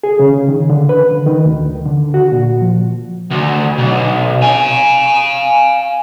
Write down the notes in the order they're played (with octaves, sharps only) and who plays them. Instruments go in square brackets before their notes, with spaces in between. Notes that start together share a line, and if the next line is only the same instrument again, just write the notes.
[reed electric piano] G#4
C#3
D#3
D3
B4
D3
D#3
D2
D3
F#4
A#2
F3
[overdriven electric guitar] D2
B1
F5 G#5